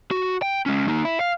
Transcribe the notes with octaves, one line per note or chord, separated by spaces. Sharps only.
F#4
G5
G#3 C#4
A#3 D#4
E4
F5